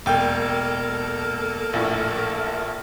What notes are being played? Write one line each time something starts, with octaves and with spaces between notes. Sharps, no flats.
E1 A#3 A4 G5
A#1 A2